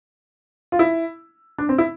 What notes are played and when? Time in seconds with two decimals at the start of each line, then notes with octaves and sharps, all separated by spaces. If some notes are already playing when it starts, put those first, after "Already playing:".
0.72 F4
0.79 E4
1.58 D4
1.69 C4
1.78 E4